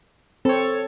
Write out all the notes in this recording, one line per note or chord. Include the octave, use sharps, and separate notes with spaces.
C4 A4 C#5